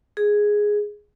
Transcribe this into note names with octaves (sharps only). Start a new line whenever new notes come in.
G#4